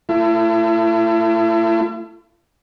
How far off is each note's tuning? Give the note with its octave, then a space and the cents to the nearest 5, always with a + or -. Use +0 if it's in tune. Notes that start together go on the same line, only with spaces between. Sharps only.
A3 +25 E4 +40